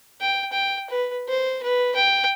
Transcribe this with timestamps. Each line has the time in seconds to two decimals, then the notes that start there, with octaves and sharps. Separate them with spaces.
0.21 G5
0.52 G5
0.90 B4
1.28 C5
1.63 B4
1.95 G5